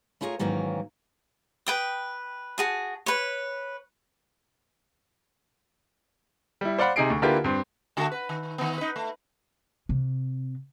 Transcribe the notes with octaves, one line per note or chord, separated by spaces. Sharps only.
A3 E4 F4 G#4 A#4 C#5
G#2 D#3 E3 F#3 A#3 C#4
B4 G5 D#6
F#4 G#4 A5
B4 C#5
G3 E4
C5 D5 F5 F#5 B5
C3 D#4 G#4 C7 D7
D2
D3 A#3 E4 F4 G4 B4
G2 C4
D3 A3 F#4
B4
D#3
D#3 B3
D#4 B4
A3
C3